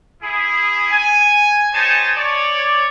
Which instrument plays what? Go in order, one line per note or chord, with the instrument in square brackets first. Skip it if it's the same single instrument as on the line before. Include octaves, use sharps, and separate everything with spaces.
[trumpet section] E4 G#4
G#5
D#4 G4 C5 C#5 G#5 A5
C#5 D5